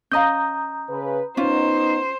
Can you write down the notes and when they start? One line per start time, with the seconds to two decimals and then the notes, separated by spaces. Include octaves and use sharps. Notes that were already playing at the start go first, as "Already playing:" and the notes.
0.12 C#4 D#5 F5 A#5 D#6 G6
0.89 C#3 B4
1.37 B3 C#4 D#4 F4 C5